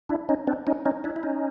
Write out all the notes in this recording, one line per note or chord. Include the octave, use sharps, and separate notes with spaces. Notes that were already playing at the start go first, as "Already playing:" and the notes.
D4 E4
C#4 D#4
C4 D4
C#4 D#4
C#4 D#4
D4 E4
E4
C#4 D#4